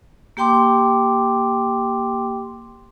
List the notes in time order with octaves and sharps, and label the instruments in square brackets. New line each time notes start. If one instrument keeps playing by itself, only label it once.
[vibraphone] A#3 G4 G5 C6 D6